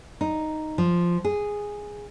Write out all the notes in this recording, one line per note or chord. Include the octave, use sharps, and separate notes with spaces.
D#4
F3
G#4